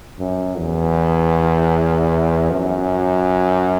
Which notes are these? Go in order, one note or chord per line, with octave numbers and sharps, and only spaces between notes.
F#2
E2
F#2